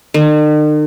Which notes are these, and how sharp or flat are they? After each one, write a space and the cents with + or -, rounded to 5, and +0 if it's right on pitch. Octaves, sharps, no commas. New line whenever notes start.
D#3 -45